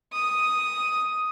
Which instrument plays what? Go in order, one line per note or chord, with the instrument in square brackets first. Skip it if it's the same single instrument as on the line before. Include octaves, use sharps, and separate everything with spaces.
[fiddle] D#6